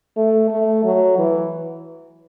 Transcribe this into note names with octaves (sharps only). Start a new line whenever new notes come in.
A3
A3
F#3
E3